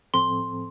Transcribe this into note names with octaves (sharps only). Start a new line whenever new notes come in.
A2 F3 C4 A4 C6